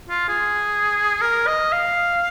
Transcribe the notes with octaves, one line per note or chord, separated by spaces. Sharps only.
F4
G#4
A#4
D#5
F5